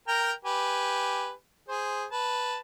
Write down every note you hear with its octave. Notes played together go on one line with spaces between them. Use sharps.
A#4 G5 A#5
G4 B4 G#5
G#4 C5
B4 A5